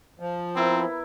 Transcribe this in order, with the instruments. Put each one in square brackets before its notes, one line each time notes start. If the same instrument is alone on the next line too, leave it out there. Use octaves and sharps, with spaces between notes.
[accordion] F3
[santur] B3 E4 A#4 [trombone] C4